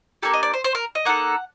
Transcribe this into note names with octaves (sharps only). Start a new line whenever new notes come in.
A#3 D4 G4 A4
D#5
D5
C5
C5
A#4
D#5
A#3 D#4 A4 F#5